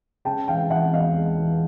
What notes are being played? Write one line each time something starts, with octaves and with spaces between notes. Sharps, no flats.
C#3 G5 A5
E3 F5 G5
E3 E5 F#5
E2 D#5 F5
G#3
E3